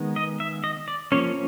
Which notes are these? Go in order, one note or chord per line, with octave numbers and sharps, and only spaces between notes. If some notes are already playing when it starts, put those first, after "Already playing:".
Already playing: D#3 G#3 B3
D#5
E5
D#5
D5
F3 A#3 C#4 C#5